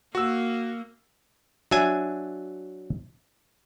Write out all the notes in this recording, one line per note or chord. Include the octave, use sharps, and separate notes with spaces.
A#3 F#4 E6
F#3 D4 E5 G#5